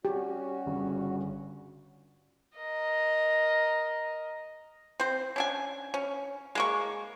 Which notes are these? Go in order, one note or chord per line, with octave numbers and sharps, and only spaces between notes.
G3 C#4 F#4 G4
G1 G2 C#3
A#4 D#5
C4 C5
C#4 D4 G#5
C#4
G#3 A#3 C#6